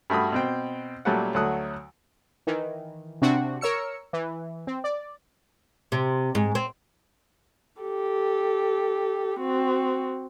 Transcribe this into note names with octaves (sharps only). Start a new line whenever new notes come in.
G2 A3 F#4 B5 D#6
B2 C4 G5
A#2 F#3 G3 A3 C#4 F#5
D2 F#3 A3 F#5 D#6
D#3 E3
C3 C4 D4 F#4
A#4 C#5 E6 C#7
E3
C4
D5
C3
G#2
C4
G4 A4
C4 F#4